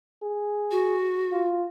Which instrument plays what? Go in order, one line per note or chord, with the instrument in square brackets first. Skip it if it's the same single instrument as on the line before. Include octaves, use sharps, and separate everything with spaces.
[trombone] G#4
[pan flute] F#4
[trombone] F4